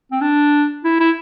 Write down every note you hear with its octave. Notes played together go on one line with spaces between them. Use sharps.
C4
D4
E4
E4